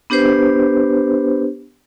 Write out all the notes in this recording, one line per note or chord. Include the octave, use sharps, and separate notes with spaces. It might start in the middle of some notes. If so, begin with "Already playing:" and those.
B3 D4 G4 B4 C5